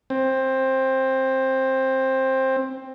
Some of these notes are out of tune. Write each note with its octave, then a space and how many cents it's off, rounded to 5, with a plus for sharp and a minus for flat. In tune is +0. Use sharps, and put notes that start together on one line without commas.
C4 +15